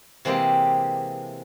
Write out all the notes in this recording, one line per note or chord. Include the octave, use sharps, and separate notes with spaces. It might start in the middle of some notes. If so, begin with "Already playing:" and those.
C3 E3 G#3 A#3 G4